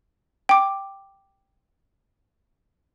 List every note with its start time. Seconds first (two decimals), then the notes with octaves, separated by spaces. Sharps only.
0.49 G5 D6